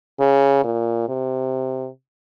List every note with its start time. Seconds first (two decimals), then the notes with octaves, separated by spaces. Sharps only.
0.20 C#3
0.64 A#2
1.09 C3